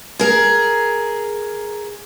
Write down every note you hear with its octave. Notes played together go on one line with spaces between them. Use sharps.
G#4 A#4